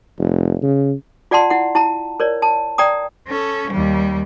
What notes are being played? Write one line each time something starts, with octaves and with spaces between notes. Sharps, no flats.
F1
C#3
F4 D5 F#5 A5 C6
E4 F#5
E4 A5 A#5
A#4 C#5 D5
A5
D5 G5 A#5 D#6
C#4 A4
D#2 G3